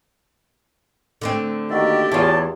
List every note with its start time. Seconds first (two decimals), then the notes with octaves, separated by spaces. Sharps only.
1.21 D3 A3 C4
1.70 D#3 A#3 F#4 G4 D5 E5
2.12 E2 E4 F4 C#5 D5 A5